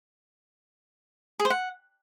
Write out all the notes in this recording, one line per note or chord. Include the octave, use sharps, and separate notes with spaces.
G#4
C5
F#5